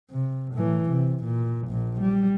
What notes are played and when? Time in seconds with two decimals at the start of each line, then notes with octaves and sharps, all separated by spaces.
0.11 C3
0.54 A2 E3
0.89 C3
1.24 A#2
1.68 A#1 A#2
2.00 G3